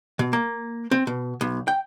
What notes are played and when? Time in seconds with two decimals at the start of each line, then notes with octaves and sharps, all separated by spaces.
0.19 B2
0.33 A#3
0.91 C4
1.07 B2
1.41 B1
1.68 G5